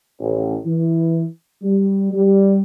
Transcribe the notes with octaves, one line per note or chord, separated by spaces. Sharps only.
A1
E3
G3
G3